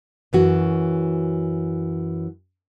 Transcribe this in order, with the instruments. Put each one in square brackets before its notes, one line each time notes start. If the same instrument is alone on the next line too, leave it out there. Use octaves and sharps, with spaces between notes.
[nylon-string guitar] F#2 E3 F#4